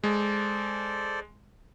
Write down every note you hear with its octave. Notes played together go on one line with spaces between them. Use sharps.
G#3 A4 C5 D5